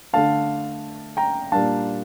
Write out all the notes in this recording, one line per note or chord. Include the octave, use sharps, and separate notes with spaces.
D3 A3 D4 F5 A5
G5 A#5
A#2 G3 A#3 D4 F5 A5